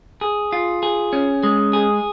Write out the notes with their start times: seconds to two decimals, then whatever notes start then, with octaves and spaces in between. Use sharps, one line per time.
0.21 G#4
0.52 F4
0.83 G#4
1.13 C#4
1.43 G#3
1.73 G#4